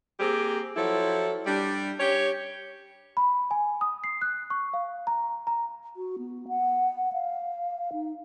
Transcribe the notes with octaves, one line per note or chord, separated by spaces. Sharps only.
A#3 C4 G4 G#4
F3 F#3 E4 A4
G3 D4
G4 C#5
B5
G#5
D#6
C7
F#6
C#6
F5
A#5
A#5
F#4
B3
F#5
F5
D#4